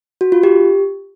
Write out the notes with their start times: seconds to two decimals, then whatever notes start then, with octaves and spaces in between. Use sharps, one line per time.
0.21 F#4
0.32 F4
0.43 G4